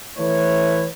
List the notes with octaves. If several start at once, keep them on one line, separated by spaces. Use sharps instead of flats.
E3 A3 E4 B4 C#5